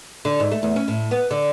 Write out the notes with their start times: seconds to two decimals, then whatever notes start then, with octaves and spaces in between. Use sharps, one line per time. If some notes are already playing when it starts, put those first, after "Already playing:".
0.25 D3
0.40 G#2
0.52 A3
0.63 E2
0.76 C#4
0.88 A2
1.11 B3
1.31 D3